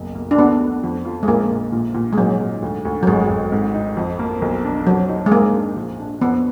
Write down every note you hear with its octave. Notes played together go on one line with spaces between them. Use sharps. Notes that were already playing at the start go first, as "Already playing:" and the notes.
Already playing: F#1 B1
A#3
D4
D2 B3
D2
F2
F4
G#3
A#1 A#3
A#1
A#2
A#2
G#3
G#2 F#3
G#2
D2
D2
F#3
G#1 G#3
G#1
G#2
D#4
F2
A#3
B1
D4
F2 F#3
D#4
G#3
G#2 A#3
D4
A#1
D4
F2 B3